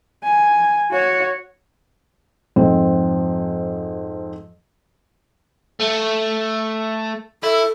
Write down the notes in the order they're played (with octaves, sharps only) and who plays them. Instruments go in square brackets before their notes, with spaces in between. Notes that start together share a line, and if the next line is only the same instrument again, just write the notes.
[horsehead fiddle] G#5
F#4 C#5
[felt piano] F2 G#2 C4
[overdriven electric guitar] A3
[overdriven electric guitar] E4 [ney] A4